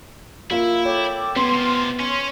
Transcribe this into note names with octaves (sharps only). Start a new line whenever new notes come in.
A#3 E4 F4
A4 C#5 G5 D6
G3 B3 G#4 C6
C3 F4
C#4 C#5 C6